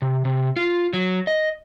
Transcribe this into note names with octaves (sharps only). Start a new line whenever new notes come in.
C3
C3
F4
F#3
D#5